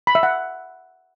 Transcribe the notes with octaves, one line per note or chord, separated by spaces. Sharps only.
B5
E5
F#5